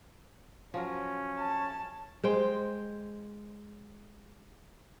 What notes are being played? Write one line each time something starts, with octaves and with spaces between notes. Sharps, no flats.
F3 F#3 C#4 A#4
A5
G#3 C5 G5